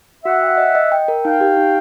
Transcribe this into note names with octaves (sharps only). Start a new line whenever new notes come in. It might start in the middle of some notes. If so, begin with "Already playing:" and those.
F#4 E5 F#5
G5
D#5
D#5
G5
A#4
D#4 F5 G5
G4
D#4